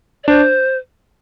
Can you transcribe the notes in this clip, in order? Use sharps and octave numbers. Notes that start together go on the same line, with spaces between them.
D5
D4 C5